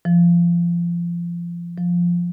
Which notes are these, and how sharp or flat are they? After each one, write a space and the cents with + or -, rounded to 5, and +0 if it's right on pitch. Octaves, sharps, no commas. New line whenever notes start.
F3 -25
F3 +0